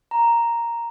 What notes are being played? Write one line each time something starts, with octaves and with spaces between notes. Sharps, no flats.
A#5